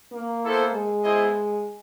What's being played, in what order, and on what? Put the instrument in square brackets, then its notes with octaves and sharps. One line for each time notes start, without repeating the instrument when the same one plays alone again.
[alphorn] A#3
[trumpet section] B3 E4 A4 C5
[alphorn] G#3
[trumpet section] B3 E4 G#4 C5 D#5